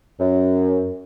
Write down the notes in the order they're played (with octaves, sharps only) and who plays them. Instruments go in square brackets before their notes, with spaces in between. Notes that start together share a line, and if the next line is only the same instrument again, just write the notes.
[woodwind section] F#2